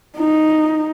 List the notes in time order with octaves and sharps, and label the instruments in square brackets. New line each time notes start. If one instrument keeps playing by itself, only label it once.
[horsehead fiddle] D#4